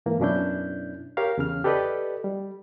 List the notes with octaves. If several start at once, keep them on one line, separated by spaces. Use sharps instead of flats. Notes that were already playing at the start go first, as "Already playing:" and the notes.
G#2 E3 A#3
F#2 B2 C#4 D4 E4 G6
G4 A#4 C#5 F5
E2 C#3 F6
G4 A4 B4 D5 D#5
G3